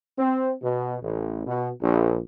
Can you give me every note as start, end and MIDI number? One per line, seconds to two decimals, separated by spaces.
0.18 0.53 60
0.62 0.96 47
1.03 1.42 33
1.46 1.70 47
1.81 2.20 34